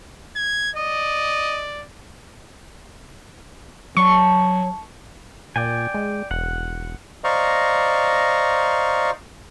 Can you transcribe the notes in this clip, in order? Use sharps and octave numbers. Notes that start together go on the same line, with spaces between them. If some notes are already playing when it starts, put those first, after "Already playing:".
G#6
D5 D#5
F#3 D5 A5 C#6
A#2 D5 G5 G#5
G#3
E1 F#5
C5 D5 D#5 F5 A#5 C#6